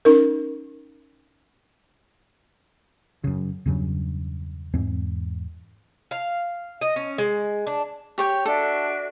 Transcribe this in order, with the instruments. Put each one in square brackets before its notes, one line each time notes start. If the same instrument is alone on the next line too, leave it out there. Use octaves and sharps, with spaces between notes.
[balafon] C#4 D#4 A#4
[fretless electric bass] F#2 C#3
E2 G2 C#3 F#3
E2 G#2 C4
[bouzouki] F5
D#5
C#4
G#3
D4
[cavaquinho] G4 C#5 G5
[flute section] D4 F#4 E5 [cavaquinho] A4